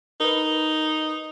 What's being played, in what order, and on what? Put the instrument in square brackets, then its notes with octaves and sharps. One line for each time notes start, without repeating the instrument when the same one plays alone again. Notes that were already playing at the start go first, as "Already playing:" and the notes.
[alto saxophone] D#4 [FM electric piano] A#4 B4